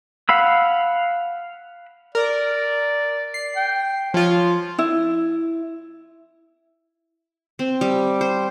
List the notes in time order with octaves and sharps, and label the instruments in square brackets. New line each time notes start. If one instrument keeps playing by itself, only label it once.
[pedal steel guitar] F5 F#5 B5 E6
[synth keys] A#4 [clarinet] D5
[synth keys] C7
[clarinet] G5
[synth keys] F3 F4 [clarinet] C#5
[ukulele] E4
[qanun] C4
G3
C5